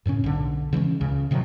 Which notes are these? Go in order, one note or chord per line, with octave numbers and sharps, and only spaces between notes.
F#2 A2 C#3 C#4
B1 D3
C#3 E3 G#3 C#4
C#2 C#3
C3 D#3 F3 F#3